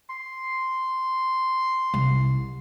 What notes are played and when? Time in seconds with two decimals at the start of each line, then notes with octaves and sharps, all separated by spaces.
0.10 C6
1.94 C2